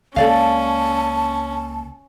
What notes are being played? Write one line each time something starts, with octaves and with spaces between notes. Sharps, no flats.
C#2 G#3 A#3 C#4 A4 D5 F5 A5